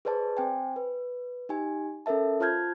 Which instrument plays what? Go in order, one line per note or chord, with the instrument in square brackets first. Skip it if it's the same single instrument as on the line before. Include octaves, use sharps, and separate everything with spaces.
[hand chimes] G#4 B4 C5 D5 A5
C4 C5 G5 G#5
B4
D#4 G4 G#5
C#4 A4 A#4 E5 A5
F4 C5 A5 F6 G6 G#6